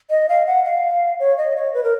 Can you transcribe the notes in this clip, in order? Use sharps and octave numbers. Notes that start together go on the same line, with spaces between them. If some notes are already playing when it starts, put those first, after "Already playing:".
D#5
F5
F#5
F5
C#5
D#5
C#5
B4
A#4